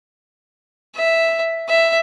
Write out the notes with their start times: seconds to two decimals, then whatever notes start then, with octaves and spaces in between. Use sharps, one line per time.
0.96 E5
1.68 E5